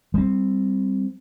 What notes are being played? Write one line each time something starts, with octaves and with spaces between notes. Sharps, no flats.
G3 C4